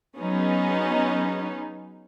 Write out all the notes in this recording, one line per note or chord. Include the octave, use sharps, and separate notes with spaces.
F#3 B3 C#4 D#4 G#4